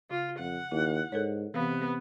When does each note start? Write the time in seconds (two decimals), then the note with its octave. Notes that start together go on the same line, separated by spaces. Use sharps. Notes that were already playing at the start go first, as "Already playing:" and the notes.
0.10 C#3 F4
0.39 F2 F#5
0.72 D#2 E4
1.12 G#2 A4 A#4 C#5
1.54 C3 E3 B3 F5